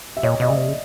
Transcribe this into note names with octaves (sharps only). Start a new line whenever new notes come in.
E5
A#2 C#5 D#5
B2 D#5
C#3 D5 E5
C3
C#3